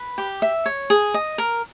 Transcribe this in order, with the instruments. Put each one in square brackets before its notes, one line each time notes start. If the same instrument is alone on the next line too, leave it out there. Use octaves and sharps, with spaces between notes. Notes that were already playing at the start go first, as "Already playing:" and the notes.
Already playing: [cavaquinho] B4
G4
E5
C#5
G#4
D#5
A#4